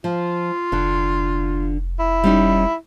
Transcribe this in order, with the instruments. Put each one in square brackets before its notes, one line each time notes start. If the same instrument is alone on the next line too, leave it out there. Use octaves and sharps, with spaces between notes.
[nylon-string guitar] F3 [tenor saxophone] F4
[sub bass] F1 [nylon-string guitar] D3 D4
[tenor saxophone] E4
[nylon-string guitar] G3 C#4 D#4